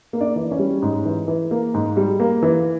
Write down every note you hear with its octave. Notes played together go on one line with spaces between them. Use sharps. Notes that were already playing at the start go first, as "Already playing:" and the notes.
A#3
D4 D5
E3
C#4 C#5
G3
G#2
E3
E3
A#3
G#2
G3
A#3
E3